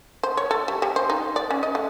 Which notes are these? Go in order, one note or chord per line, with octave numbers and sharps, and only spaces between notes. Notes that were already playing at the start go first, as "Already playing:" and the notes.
C5
C#5
A4
G3
G3
C5
D#4
D5
C#4
D#5
A3